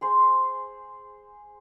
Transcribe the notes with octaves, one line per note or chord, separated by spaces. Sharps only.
G#4 C5 C6